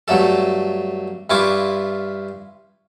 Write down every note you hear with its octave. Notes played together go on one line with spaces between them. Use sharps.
G2 F#3 A3 A4
G2 E4 F4 C#6 D6